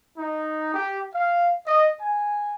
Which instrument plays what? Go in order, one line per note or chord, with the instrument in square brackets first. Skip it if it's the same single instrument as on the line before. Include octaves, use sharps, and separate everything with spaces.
[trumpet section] D#4
G4
F5
D#5
G#5